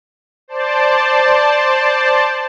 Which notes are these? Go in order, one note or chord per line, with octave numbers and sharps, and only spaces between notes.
C5 D5 A5